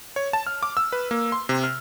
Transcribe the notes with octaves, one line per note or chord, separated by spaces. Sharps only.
C#5
A5
F6
D6
E6
B4
A#3
C6
C3
F6